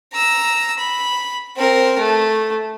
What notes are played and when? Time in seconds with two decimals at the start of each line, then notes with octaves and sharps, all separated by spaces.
0.13 A#5 E6
0.78 B5
1.56 C4 A#4
1.98 A3